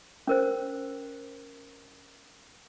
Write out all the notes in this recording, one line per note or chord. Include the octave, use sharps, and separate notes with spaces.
C#4 A#4 C5